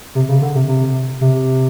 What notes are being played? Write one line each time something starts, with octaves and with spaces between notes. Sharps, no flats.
C3
C#3
D3
C3
C3
C3